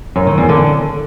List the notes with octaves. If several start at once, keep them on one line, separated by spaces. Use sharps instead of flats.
F#2
D#3
E2
D3